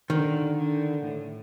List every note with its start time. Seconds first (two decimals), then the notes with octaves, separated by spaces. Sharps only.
0.10 D3 D#3
0.57 D3
1.03 A2